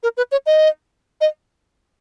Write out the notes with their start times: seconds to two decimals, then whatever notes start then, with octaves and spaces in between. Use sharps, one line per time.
0.03 A#4
0.17 B4
0.32 C#5
0.46 D#5
1.21 D#5